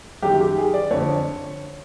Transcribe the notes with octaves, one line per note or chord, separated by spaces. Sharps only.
F#2 D#3 G4
G4
G#4
D5
F2 D3 C#5